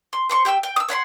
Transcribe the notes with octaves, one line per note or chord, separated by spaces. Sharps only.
C6
C5 C6 C#6
G4 G5 C6 E6
G5
D#6 E6
C#5 F#5 B5 C6